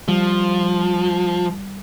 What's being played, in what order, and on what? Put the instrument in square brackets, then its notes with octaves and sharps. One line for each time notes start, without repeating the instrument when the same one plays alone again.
[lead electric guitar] F3 [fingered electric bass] G3